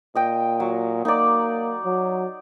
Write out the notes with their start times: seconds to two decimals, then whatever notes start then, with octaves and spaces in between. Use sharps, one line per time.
0.15 A#2 D#5 G5
0.60 F#3
1.05 A#3 D#4 D5
1.85 F#3